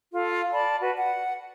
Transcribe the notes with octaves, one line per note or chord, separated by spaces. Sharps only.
F4 A4
D5 A5 B5
F#4 B4
F#5